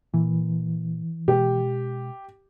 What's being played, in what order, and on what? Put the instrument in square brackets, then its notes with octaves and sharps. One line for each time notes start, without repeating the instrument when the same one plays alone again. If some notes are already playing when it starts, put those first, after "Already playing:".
[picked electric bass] A#2 [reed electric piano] E3
[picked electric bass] B2 G#3 [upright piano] G4